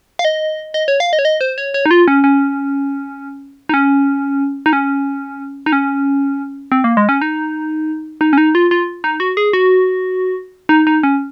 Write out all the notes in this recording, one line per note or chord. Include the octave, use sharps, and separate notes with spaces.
F5
D#5
D#5
C#5
F5
D#5
C#5
D#5
C5
C#5
C#5
D#4
F4
C#4
C#4
D#4
C#4
D#4
C#4
D#4
C#4
C4
A#3
G#3
C#4
D#4
D#4
C#4
D#4
F4
F4
D#4
F#4
G#4
F#4
D#4
D#4
C#4